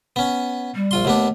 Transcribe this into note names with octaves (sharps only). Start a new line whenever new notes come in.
B3 C#4
G3
A#1 F4 C6
D#2 A3 B3 D4